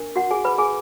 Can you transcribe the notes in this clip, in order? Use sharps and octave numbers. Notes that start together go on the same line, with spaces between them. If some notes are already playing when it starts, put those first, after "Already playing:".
Already playing: D4 A#4
F#4 F#5
G#4 G#5
B4 B5
G#4 G#5